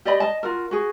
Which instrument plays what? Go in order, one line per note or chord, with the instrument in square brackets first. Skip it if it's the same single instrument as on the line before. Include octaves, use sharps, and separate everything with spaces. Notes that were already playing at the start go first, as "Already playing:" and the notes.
[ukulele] G4 D5 D#5 B5
D#5 A5
F4 F#4 A#4
F#4 G#4